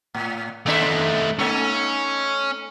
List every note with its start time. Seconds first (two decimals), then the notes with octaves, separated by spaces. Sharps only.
0.14 A2
0.66 D#2 A3 D4 D#4 E5
1.39 A3 C#4 D#4 A4